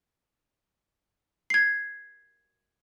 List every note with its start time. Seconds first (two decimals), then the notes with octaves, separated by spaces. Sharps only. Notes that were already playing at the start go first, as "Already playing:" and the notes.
1.50 G#6 C7